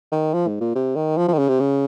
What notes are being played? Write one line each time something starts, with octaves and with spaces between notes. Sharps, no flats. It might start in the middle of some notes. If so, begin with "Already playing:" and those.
D#3
F3
G#2
A#2
C3
D#3
F3
F3
D#3
C#3
C3
C#3